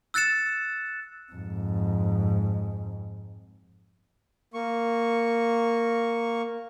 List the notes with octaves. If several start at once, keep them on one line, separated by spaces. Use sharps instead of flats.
E6 F#6 A6 C#7 E7
F2 G#2
A#3 C#6